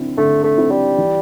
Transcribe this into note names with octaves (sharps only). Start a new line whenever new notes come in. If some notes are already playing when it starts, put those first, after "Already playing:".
Already playing: D3 C4 E4
D3 A3
A3
C4 E4
G3
E3